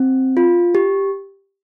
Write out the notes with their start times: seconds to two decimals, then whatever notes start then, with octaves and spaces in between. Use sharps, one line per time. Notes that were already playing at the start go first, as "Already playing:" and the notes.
Already playing: C4
0.37 F4
0.75 G4